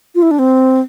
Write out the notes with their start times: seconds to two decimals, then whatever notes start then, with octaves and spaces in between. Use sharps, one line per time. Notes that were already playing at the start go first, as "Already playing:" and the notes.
0.15 F4
0.22 E4
0.31 D4
0.39 C4